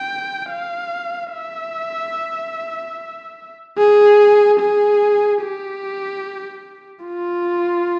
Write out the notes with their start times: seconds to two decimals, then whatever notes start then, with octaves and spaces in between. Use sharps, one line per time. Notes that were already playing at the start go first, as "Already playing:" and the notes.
Already playing: G5
0.50 F5
1.32 E5
3.78 G#4
4.60 G#4
5.42 G4
7.05 F4